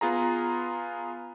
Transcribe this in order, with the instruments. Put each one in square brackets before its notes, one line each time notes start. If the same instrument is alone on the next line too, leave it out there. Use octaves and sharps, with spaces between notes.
[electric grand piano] B3 F4 G#4 A#5